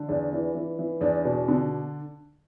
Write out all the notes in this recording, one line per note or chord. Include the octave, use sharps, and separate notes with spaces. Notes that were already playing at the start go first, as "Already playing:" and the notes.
Already playing: D3
E2 D4
E3
E3
E3
E2 D4
B2
D3